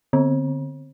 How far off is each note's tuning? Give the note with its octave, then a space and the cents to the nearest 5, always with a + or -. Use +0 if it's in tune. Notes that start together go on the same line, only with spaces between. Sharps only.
D3 +0 C4 +0